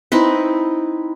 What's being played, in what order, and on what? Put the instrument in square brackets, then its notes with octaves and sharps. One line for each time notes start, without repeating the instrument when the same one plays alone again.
[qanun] C4 D#4 E4 B4